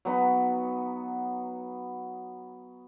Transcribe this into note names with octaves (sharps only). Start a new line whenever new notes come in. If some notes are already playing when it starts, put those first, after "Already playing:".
F#3 B3 D#4